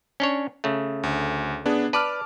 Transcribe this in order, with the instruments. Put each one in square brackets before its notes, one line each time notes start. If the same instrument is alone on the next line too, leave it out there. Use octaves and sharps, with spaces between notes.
[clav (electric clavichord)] C#4 D4 C#5
C#3 A3
[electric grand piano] D2
B3 D4 G#4
[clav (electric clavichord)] B4 D5 [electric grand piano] A5 D6 F6